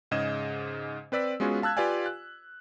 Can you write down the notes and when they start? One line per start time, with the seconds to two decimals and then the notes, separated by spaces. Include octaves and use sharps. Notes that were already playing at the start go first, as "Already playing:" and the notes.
0.11 G#2 C#3 D#5 G#6 E7
1.12 C4 B4 D5 E6 B6
1.40 G#3 B3 C#4 F4 F#4 G#4
1.62 F5 A5 E6 F#6 G#6
1.77 F4 G4 B4 D5 F5 G#5
2.06 F#6